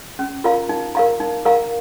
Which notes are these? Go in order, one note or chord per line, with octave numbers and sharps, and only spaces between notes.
C#4
F4 A#4 F5 A#5
D#4
A#4 F5 A#5
D#4
A#4 F5 A#5